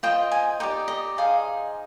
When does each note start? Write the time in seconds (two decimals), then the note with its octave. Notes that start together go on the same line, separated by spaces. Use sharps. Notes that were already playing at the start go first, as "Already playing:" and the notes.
0.03 F4 C5 D#5 G5
0.31 G#5
0.60 D#4 G4 D5 G5
0.88 D#5
1.17 D#4 G#4 C5 D#5 F5